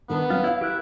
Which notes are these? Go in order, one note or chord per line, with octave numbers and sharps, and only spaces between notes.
D#3 B3 D4 A#4
F#3 C4 C#4 F4
E4 C#5 E5 F5
E4 G4 A#4 F#6